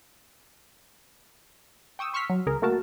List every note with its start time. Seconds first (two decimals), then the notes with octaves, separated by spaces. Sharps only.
1.99 G5 C#6 D#6 E6
2.14 C6 C#6 E6 F6 B6
2.30 F#3
2.47 C#2 G#4 A#4
2.62 A3 A#3 F#4 A#4 A5